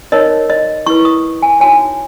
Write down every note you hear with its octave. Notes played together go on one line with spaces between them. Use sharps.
D#4 A#4 C#5 D#5
D#5
E4 B4 C#6
D#6
G#5
D#4 F#4 C#5 G#5